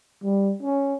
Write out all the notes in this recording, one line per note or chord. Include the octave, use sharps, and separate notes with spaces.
G3
C#4